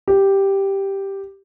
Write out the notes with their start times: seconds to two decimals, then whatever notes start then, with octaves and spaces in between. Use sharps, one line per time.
0.08 G4